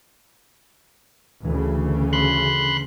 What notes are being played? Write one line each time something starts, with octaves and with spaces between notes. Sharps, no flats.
D2 C#3 E3
B5 C6 F#6